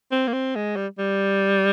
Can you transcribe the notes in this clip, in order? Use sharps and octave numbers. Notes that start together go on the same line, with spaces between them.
C4
A#3
C4
G#3
G3
G3